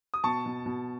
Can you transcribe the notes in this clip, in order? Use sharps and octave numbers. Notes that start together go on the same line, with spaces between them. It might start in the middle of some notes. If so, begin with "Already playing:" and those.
D#6
B2 A5 C#6
B2
B2